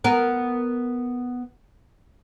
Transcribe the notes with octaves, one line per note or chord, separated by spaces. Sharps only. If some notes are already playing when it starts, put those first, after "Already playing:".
B3 A#4